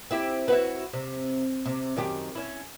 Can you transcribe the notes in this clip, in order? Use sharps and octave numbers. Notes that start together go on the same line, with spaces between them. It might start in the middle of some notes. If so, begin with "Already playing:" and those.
C4 E4 G4
E4 F#4 B4
C3
C3
F#2 D#3 G4
C#4 E4